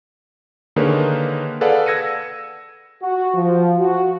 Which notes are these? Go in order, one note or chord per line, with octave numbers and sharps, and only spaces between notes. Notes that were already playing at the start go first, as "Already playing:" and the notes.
D3 D#3 A#3 G#4 B4 C#5
G#4 A4 B4 D5 F5 F#5
E6 G#6 A#6 C#7 D#7
F#4
F3
F#4